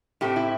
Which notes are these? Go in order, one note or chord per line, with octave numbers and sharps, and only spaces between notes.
A2 A3 C4 G4
E4